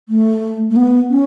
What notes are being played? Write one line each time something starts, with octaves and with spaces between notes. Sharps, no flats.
A3
A3
B3
C#4